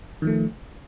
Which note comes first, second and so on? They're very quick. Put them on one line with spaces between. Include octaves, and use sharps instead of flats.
D#3 F3 A3